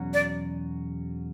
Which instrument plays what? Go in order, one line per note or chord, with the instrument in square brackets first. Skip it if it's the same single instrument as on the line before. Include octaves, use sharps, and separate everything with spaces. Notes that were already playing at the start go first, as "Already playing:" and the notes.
Already playing: [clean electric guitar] E2 B2 F#3 C#4 F#4
[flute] D5